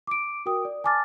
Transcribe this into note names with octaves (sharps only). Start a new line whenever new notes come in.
D6 D7
F#4 A#4 G5 D#6
D5
G#5 A5 D6 F6 A6